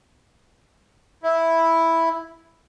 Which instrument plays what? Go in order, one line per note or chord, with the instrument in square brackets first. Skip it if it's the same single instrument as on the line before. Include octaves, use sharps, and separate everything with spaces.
[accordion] E4